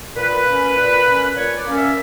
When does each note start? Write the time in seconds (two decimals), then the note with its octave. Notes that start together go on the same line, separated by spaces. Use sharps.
0.16 A#2 B4
0.46 A#3 C#4
0.76 A#2
1.06 A#3 C#4
1.36 A#2 C#5
1.56 D5
1.66 A#3 C#4
1.76 E5